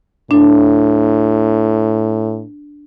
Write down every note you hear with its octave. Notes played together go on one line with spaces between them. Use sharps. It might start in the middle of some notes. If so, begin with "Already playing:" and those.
A2 D4